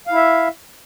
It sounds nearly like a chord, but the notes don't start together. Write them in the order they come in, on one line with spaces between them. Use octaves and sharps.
F5 E4 E5